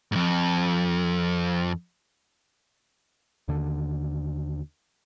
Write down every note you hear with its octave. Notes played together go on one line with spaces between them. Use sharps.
F2 G#2
D#2 D3